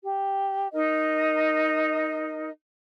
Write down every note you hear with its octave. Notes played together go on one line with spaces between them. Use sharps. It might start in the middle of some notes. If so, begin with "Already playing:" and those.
G4
D#4 A#4 D#5